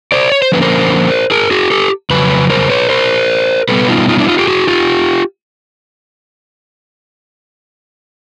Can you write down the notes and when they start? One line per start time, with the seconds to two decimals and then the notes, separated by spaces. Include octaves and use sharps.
0.12 C5 D5
0.32 C#5
0.42 C5
0.52 D3 F3 A#3 C#4 B4
0.62 A#4 C5
1.31 G#4 A#4
1.51 F#4 G#4
1.71 G4 A4
2.10 F2 C#3 F#3 B4
2.50 A#4 C5
2.70 B4 C#5
2.89 A#4 C5
3.69 B2 G3 B3 A4 B4
3.89 D#4 F4
4.08 D#4 F4
4.19 D4 E4
4.28 D#4 F4
4.38 F4 G4
4.48 F#4 G#4
4.68 F4 G4